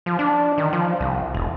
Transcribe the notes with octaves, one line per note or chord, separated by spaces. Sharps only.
F3
D4
D#3
F3
C2
E1